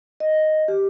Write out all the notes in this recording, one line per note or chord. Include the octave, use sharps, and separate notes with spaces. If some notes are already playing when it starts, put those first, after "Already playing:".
D#5
G4